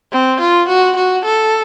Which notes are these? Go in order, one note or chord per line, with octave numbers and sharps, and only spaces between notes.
C4
F4
F#4
F#4
A4